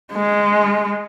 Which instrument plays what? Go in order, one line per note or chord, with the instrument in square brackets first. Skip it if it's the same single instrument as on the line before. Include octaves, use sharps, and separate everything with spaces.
[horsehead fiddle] G#3